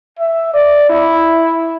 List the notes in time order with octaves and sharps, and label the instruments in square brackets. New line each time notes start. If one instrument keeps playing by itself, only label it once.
[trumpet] E5
D5
E4